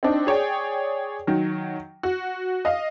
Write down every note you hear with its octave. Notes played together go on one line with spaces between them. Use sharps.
C4 D4 D#4
G#4 C#5 D5 G5
D#3 F#3
F#4
D#5 F5